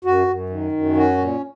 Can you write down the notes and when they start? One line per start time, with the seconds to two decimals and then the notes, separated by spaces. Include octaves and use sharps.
0.05 F#2 F#4
0.28 F#2
0.49 D#3
0.72 F#2
0.96 C#4 F#4
1.18 A#2